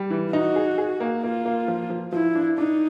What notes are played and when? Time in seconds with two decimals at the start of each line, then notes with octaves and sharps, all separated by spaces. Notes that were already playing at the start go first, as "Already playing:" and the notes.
Already playing: G3
0.10 E3
0.33 D#4 F#4
0.56 G#4
0.78 G#4
1.00 A#3
1.23 A#3 F4
1.45 A#3
1.68 F3
1.90 F3
2.12 F3 E4
2.35 D4
2.58 D4 D#4